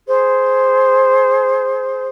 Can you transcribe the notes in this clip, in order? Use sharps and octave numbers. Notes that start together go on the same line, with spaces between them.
G#4 C5